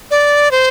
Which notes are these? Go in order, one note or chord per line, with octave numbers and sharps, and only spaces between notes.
D5
C5